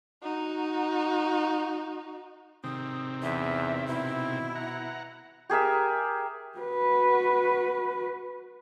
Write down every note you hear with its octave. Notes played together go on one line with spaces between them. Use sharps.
D#4 F#4
C3 D#3 C4 D#6
E2 E5
B2 E4
F#5 A#5
G4 G#4 A#4 E5
F#4 B4